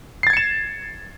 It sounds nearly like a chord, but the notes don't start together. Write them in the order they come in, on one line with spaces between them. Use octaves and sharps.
C7 A6 G#6 C#7 E7